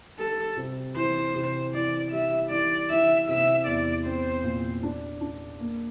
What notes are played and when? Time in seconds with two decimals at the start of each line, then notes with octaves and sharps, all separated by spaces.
0.19 G3 A4
0.57 C3
0.96 E3 C5
1.35 C3
1.74 E3 D5
2.12 G3 E5
2.50 E3 D5
2.90 E3 E5
3.28 C3 E5
3.66 E2 D5
4.06 C4 C5
4.43 A#2
4.83 D4
5.21 D4
5.60 A#3